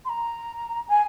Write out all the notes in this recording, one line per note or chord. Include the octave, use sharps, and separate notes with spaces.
C6
A#5
G#5